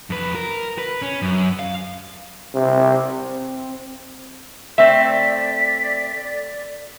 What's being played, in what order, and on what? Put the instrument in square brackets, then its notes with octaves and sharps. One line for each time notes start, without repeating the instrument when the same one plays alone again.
[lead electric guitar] F2 B4
A#4
B4
C#4
F#2
F5
[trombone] C3
C4
[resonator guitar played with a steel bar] A3 C4 [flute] D5 [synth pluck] E5 [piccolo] B6